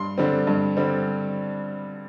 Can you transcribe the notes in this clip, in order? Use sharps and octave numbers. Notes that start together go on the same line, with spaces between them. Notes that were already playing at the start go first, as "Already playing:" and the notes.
Already playing: G2 C6
D3 G3 C4
G2
D3 G3 C4